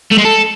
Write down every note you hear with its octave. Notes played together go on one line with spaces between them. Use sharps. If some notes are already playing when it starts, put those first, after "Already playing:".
A3
G#3
A4